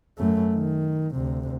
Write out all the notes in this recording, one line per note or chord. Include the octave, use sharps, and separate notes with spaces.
F#2 A3
D#3
D2 C3